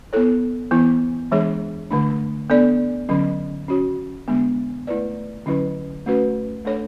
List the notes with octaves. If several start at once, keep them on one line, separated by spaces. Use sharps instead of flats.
B3 E4 A4 C#5
E3 B3 E4
E3 G#3 D4 G#4 C#5
D3 A3 D4
B3 D4 A4 D5
D3 F#3 C#4
C#4 F#4 C#5
D3 G#3 B3 D4
A3 E4 B4 D5
D3 F#3 C#4 E4 B4
A3 C#4 F#4 B4
A3 D4 A4 C#5